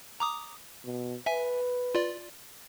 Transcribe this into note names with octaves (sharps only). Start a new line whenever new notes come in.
A#5 D6 D#6
B2
B4 E5 G#5
F4 D5